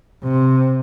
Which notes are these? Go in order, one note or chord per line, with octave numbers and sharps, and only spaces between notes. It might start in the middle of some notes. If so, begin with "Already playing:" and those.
C3